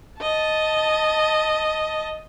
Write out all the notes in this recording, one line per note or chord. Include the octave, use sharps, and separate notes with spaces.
D#5 A5